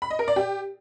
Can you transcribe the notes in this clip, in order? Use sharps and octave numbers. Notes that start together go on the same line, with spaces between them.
B5
D#5
A#4
D5
G4